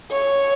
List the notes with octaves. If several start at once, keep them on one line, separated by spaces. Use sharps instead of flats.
C#5